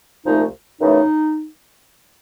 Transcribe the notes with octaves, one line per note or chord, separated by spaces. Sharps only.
C2 A#2 F3 A3 D#4
F#2 C#3 E3 A3 D#4